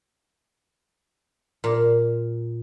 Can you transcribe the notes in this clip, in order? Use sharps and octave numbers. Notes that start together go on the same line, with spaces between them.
A#2